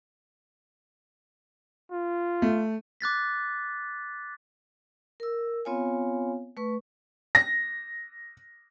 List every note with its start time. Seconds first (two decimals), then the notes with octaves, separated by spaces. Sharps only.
1.92 F4
2.42 A3
3.01 D6 F#6 A6 B6
5.20 A#4 E6
5.65 B3 C4 F4 C#5 F5 G#5
6.57 A3 B4 C#6
7.35 A#6